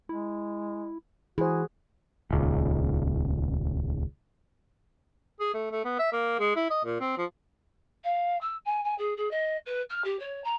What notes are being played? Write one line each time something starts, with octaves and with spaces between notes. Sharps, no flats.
G#3 E4
E3 E4 F#4 G#4 C5
D#1 C#2
G#4
A3
A3
B3
E5
A#3
G#3
E4
D#5
A#2
C4
F3
F5
E6
G#5
G#5
G#4
G#4
D#5
B4
F6
G4
C#5
A#5